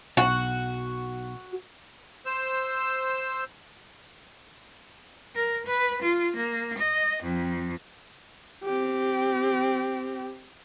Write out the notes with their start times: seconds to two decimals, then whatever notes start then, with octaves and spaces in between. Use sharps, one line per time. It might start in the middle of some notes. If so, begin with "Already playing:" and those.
0.17 B1 F#4
2.26 C5 E6
5.36 A#4
5.67 B4
6.02 F4
6.36 A#3
6.78 D#5
7.23 F2
8.65 C4 G4